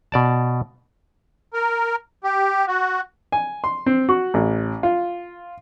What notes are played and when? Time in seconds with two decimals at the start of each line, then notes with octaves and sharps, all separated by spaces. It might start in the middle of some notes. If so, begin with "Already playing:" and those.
0.12 B2 D5 A5
1.54 A#4
2.24 G4
2.67 F#4
3.32 G#5
3.64 C6
3.86 C4
4.09 F#4
4.34 A1
4.83 F4